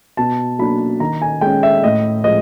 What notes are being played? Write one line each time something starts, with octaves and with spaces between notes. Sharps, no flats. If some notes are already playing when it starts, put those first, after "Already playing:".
B2 A5
F#3 A#3 D4 B5
D#3 A#5
G#5
G#3 C#4 G5
E5
A2 D#5
F3 G#3 D#5